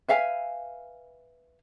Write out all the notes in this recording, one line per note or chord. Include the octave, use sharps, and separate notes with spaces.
B4 E5 F5 G#5